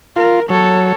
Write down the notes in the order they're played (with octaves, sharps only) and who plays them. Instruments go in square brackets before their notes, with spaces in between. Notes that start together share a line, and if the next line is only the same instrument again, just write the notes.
[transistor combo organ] F4 [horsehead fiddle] A#4
[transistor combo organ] F#3 [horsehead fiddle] A4 C#5